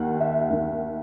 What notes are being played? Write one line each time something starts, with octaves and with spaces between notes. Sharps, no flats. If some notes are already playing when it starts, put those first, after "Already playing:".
Already playing: D#2 D#3 F#5
E5
D#2 D#3